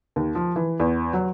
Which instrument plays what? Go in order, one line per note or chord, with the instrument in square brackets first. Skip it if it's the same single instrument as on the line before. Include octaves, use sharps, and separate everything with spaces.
[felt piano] D#2
F3
E3
E2
F#3